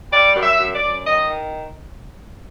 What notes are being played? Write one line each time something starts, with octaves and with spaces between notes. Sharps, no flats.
G3 D5
F#2
E5
F#2
D5
F#2
D#3 D#5
D#3